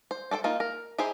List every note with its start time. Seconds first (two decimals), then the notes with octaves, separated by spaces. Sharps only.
0.11 C5
0.31 D4 A4 C5 G5
0.44 A#3 D#4 F4
0.60 A#4
0.98 D#4 E4 G4 G#4 C5